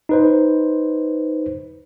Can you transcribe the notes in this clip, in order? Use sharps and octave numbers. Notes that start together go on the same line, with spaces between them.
D#4 B4 C5